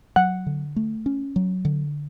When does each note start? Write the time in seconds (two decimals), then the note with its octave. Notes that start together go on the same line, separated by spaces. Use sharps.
0.16 F#3 F#5
0.46 D3
0.76 A3
1.06 C#4
1.36 F#3
1.65 D3